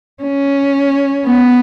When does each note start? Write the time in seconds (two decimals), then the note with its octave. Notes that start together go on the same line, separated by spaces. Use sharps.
0.23 C#4
1.26 B3